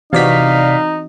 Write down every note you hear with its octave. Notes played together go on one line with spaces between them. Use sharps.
C3 E3 C4 D#4 F#4 D5 F5 B6